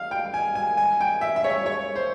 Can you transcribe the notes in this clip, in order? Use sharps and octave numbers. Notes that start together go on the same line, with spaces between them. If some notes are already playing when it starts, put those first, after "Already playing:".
Already playing: F5
G5
G#5
G#5
G#5
G5
E5
E5
C#5
C#5
C5